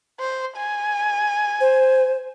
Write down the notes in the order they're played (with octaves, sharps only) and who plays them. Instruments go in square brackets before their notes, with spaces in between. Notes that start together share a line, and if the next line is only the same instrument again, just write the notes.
[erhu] C5
G#5
[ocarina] C5